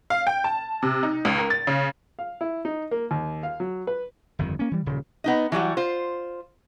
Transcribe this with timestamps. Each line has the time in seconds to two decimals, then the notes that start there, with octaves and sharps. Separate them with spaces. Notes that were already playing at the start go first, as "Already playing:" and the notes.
0.10 F5
0.27 G5
0.44 A5
0.82 C3
1.03 D#4
1.25 C#2
1.38 A#4
1.50 A6
1.67 C#3
2.19 F5
2.41 E4
2.65 D#4
2.91 A#3
3.11 D#2
3.43 F5
3.60 F#3
3.87 B4
4.39 G1 F2 D#3
4.59 A#3 C#4
4.71 E3 G3
4.86 D#1 C#3
5.24 B3 D#4 D#5
5.52 E3 F#3 G3 F#4
5.77 F4 C5